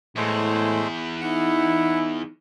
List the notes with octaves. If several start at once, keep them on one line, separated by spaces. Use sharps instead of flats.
E2 A2 G#3 A3 C5
D#4 E4 F#5